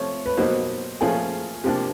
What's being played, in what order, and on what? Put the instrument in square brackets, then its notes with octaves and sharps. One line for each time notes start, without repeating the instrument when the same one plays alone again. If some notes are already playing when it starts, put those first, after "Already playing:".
Already playing: [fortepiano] C3 F3 A3 [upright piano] C#5
[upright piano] B4
[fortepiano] B2 F#3 A#3 D#4 G4 [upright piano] C5
[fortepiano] A#2 F3 A3 C#4 F4 [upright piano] G#4
[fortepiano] C3 F3 A#3 D4 [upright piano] G4